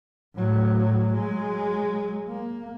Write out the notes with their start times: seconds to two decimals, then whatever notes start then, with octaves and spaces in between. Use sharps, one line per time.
0.35 A2 F#3
1.13 F#3 G#3
2.28 A#3